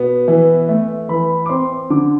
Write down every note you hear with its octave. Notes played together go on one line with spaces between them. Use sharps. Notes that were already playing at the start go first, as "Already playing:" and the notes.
Already playing: B2 B3
E3
A3
E3 B5
D6
C4 C6
D3 D6